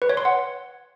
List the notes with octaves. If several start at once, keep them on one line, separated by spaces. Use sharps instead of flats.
B4
C#5
C6
F#5